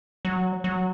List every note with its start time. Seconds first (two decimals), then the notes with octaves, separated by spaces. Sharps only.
0.25 F#3
0.64 F#3